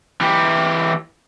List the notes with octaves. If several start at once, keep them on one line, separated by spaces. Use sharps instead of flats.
E3 G4